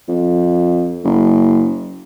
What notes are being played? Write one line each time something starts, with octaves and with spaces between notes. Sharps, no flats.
F2
F#1